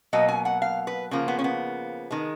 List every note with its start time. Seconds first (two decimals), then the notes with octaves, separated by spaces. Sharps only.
0.13 B2 F#3 A#3 D#5
0.28 G#5
0.45 F#5
0.62 F5
0.87 B4
1.11 C#3 F3 A#3
1.28 B3
1.39 C#4
1.44 B3
2.11 D#3 G#3